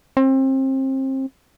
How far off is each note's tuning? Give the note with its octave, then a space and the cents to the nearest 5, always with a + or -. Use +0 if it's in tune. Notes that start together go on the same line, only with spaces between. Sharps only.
C4 +30